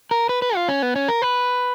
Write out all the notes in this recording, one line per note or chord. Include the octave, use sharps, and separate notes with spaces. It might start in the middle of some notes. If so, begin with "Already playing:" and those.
A#4
B4
B4
F4
C#4
B3
C#4
A#4
B4